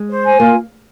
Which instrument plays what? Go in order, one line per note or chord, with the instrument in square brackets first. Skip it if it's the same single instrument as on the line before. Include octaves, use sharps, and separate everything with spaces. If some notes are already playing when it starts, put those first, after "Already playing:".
Already playing: [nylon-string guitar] G#3
[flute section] C5
G#5
[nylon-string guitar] A#3 [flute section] F4